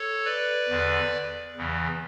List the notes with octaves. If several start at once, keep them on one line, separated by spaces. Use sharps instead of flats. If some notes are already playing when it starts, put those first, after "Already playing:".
Already playing: A4 C#5
B4 D5
E2 D3
E2 C#3 E3